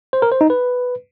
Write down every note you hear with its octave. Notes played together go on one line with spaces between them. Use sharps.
C5
A#4
C5
D#4
B4